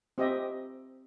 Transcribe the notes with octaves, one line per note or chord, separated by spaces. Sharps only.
C4 G4 D#5 E5